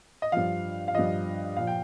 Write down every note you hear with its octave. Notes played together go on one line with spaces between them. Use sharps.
D#5
G2 F3 F5
F5
G2 F3 D#5
A#2 F3 F5
G5